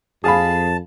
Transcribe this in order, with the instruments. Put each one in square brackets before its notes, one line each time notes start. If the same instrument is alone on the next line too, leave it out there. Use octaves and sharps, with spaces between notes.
[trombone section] F2 [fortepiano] G#4 F5 B5 [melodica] A5